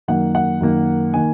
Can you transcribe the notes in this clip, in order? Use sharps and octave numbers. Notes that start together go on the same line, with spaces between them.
F#2 D#3 A#3 F#5
F#5
F#2 D#3 A#3
D#3 A#3 G#5